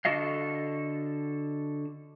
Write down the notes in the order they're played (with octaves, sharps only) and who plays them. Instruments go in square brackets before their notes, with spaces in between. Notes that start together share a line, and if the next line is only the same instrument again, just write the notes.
[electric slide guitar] D3 F#4 A4 D#5 F5